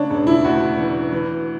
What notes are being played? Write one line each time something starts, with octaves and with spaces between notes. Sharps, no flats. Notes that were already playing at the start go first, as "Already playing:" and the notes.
Already playing: C#3 D4 C#5
E1
E4
D2 F#4
E3
E3